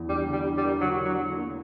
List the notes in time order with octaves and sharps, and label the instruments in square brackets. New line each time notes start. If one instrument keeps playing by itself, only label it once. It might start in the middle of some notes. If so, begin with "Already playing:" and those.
Already playing: [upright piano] E2
[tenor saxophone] G3 [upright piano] D4
[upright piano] D3
[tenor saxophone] G3
[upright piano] D4
[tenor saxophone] G3
[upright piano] A#4
[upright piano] D3 [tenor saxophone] F#3
[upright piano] D3
[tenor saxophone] F#3
[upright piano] D4
[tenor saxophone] D3
[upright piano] A#3